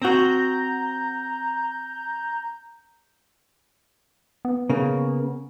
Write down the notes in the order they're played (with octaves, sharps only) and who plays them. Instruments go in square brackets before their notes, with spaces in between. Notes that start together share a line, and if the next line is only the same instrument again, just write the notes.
[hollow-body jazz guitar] C4 F#4 [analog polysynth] A#5 G6
[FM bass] B3
[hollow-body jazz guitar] C#3 A#3